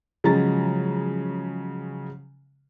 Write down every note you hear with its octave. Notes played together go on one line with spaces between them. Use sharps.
C#3 F3 F#3 G#3 A#5 A6